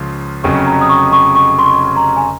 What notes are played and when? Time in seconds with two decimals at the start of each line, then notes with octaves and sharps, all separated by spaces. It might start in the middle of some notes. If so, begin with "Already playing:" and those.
Already playing: C#2 C#3 F3
0.44 F1 F2 C#3 F#3 C#4 C#6
0.66 A#5
0.81 D#6
0.89 C#6
1.13 C#6
1.35 C#6
1.59 C6
1.66 C#6
1.96 A#5
2.16 G#5